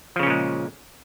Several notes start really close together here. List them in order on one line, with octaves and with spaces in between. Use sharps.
F3 C#3 C#4 A#2 G#3